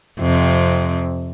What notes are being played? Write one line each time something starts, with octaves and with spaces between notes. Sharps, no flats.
F2 C3